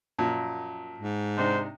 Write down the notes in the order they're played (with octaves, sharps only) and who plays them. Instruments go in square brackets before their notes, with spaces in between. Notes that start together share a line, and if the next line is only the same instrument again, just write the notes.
[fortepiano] F#2 A#2 F3 [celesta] A5
[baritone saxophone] G#2
[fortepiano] C3 D4 D#4 [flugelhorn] C5